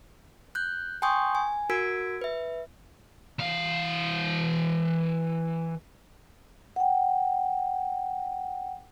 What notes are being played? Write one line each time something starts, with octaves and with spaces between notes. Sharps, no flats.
F#6 G6
G5 G#5 C6 C#6 D#6 G6
G#5
F#4 A#4 E6 G#6 B6 D7
B4 E5
E3 F5
F#5 G5